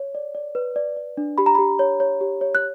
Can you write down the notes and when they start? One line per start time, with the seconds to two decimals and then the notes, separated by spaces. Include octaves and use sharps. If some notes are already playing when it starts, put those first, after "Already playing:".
Already playing: C#5
0.15 D5
0.35 D5
0.55 B4
0.76 D5
0.97 D5
1.17 D4
1.38 G4 B5
1.46 A#5
1.55 G4 B5
1.79 C#5
2.00 C#5
2.21 G4
2.41 C#5
2.55 F#6